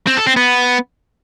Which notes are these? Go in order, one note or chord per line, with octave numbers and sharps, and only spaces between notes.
C4
A4
C4
B3